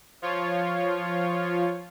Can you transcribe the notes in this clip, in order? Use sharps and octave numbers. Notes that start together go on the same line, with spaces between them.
F3 F4 C#5